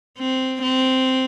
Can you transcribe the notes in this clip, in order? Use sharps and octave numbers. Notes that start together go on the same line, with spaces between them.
C4
C4